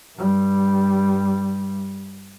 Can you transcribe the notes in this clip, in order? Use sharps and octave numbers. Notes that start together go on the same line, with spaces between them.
G2 G3